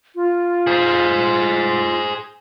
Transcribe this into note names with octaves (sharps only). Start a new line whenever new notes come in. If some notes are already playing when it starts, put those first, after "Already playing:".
F4
G#4 C5